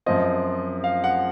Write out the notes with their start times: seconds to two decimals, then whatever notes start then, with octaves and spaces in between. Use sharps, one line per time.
0.06 F#2 F3 C4 F4 D#5
0.84 F5
1.04 F#5